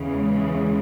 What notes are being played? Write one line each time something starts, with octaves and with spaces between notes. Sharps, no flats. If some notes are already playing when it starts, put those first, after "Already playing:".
Already playing: E2 C#3 E3
G#3